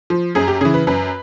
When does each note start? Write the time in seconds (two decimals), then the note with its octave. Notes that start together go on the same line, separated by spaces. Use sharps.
0.10 F3
0.35 F#2 G#4
0.48 G4
0.61 C#3 G#4
0.65 E3
0.74 B4
0.87 F#2 B4